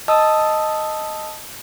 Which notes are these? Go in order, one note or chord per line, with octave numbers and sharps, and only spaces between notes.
D#5 A5 D#6 E6